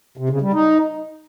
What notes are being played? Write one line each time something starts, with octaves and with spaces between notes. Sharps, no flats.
C3
C#3
G3
D#4